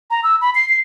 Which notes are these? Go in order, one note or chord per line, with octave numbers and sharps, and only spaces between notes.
A#5
E6
B5
C7
C7